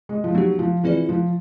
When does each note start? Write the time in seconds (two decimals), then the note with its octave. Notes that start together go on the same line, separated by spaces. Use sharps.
0.09 G#3
0.24 F3
0.34 F#3 B3 D#4 G4
0.59 F3
0.83 E3 C4 F4 G#4 B4 D5
1.09 F3